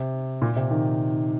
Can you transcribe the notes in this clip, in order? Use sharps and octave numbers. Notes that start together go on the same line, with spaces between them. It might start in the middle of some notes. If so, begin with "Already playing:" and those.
Already playing: C3
A#2
C3
D#3